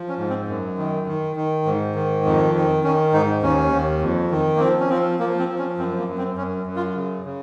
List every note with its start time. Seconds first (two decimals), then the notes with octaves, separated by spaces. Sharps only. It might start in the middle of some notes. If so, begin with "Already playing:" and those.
Already playing: F3
0.09 C#4
0.18 G#2
0.29 C4
0.48 F#2
0.78 D#3
1.07 D#3
1.36 D#3
1.65 G#2
1.95 D#3
2.25 F2
2.55 D#3
2.84 D#3 C#4
3.13 G#2 D#4
3.43 D#2 C#4
3.72 D#2
4.01 F2
4.31 D#3
4.56 A#3
4.60 F3 C4
4.80 C#4
4.89 F3 C4
5.19 F3 A#3
5.39 C4
5.48 F3
5.58 C#4
5.78 F#2 C4
5.98 A#3
6.07 F#2
6.18 C4
6.36 F#2 C#4
6.67 F#2
6.76 F4
6.96 C#3
7.25 C#3